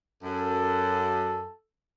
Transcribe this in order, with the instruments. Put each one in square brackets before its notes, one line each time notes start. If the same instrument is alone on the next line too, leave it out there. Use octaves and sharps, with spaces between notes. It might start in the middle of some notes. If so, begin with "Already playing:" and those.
[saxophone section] F#2 [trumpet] A4